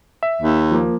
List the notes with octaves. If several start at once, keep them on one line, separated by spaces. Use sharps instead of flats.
E5
D#2
F3 A#3